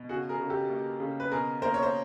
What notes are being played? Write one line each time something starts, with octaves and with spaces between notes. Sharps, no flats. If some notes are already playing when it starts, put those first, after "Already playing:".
Already playing: B2
C#3 F#4 G#4
G#4 A#4
C#3
G4 A4
A#3
C#3
B4
B2 G#4 A#4
A#3 A#4 C5
C#5
C5